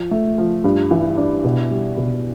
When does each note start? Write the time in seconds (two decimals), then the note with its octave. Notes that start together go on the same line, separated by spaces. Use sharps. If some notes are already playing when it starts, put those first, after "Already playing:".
Already playing: F3
0.11 A3
0.38 F3
0.64 G2
0.91 E3
1.17 D4
1.44 B2
1.71 G3
1.97 B2